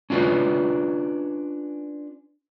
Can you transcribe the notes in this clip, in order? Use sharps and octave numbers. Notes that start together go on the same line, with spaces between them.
C#4 D4 F4 B4 C#5